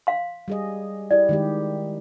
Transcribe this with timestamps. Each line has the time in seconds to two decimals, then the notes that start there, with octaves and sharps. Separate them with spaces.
0.07 F5 C6
0.48 G3 G#4 D#5
1.11 E4 G4 D5
1.29 D#3 G#3 G4